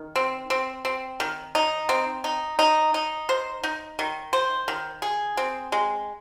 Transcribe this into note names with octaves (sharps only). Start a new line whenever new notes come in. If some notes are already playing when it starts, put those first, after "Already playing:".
Already playing: D#3
C4
C4
C4
D#3
D#4
C4
D#4
D#4
D#4
C5
D#4
D#3
C5
D#3
G#4
C4
G#3